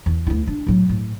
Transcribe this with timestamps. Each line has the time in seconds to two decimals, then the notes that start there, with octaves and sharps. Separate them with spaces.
0.06 E2
0.27 D2 E4
0.47 D4
0.67 A2 F#3
0.89 A2